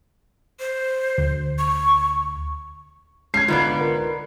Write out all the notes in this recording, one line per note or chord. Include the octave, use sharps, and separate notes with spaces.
C5
D2
C#6
G#3 C#4 G#6 C7
C2 G#2 D3 B3 F4 D5
A#4